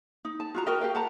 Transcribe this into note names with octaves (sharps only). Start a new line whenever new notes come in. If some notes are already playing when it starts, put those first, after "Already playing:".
D#4
A5
F4 F#4 A#5
F#4 A#4 D#5 G5
G4 F5 G5
F#5 A5 A#5